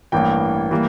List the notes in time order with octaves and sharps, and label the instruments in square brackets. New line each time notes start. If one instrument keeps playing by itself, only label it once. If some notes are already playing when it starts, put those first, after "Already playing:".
[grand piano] A1 G2 E3 A#3 G5
E3 G3 A#3